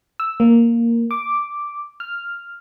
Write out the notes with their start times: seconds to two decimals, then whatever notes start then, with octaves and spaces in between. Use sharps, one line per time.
0.20 E6
0.40 A#3
1.11 D6
2.00 F6